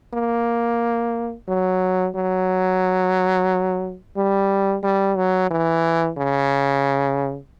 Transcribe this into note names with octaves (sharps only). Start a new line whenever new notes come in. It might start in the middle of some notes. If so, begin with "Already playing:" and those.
A#3
F#3
F#3
G3
G3
F#3
E3
C#3